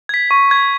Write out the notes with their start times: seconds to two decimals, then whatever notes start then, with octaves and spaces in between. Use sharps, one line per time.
0.09 G#6 B6
0.31 C#6
0.51 G#6 B6